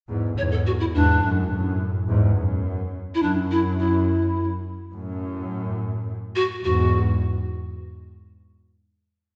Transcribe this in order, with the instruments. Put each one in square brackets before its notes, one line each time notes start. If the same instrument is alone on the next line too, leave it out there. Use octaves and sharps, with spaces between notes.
[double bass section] E2 G#2
[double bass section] E2 G#2 [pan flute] C#5
[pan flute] A4
F#4
E4
[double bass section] E2 G#2 [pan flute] D4
[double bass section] F#2 A2
F#2 A2
E2 G#2
F#2
[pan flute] E4
[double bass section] F#2 [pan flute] D4
[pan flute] E4
E4
[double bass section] F#2 A2
[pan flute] F#4
[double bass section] E2 G#2 [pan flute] F#4